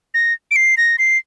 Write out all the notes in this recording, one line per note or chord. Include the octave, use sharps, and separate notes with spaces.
A#6
D7
C7
A#6
C7